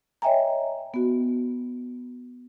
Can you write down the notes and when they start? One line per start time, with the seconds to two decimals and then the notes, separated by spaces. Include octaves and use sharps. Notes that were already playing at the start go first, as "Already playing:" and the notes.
0.22 C#5 D#5 E5 G5 G#5 A#5
0.94 B3 F#4